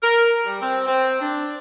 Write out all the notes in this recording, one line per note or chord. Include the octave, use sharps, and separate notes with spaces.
A#4
G3
C4
C4
D4